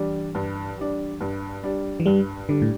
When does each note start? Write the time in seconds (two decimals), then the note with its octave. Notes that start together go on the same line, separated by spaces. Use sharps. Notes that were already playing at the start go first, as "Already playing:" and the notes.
Already playing: E3 G3 D4
0.35 G2
0.77 G3 D4
1.20 G2
1.63 G3 D4
2.00 E3
2.06 G2 G3
2.49 D3 G3 D4
2.62 A2